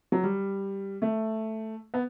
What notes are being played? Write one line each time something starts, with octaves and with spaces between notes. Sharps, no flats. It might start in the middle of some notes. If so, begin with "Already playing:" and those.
F#3
G3
A3
B3